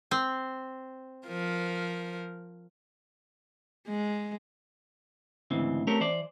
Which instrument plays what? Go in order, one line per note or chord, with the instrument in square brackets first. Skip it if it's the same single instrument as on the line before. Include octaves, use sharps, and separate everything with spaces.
[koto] C4
[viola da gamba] F3 A#4
G#3
[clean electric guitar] D2 G#2 C#3 E3 C4
A3 C4 C#4 G4 A#4
E3 C5 D5